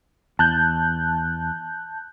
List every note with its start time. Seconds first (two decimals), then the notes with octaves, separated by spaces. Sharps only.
0.39 E2 A5 F#6 G6